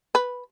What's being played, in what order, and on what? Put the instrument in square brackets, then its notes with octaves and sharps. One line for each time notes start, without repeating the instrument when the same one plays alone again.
[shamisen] B4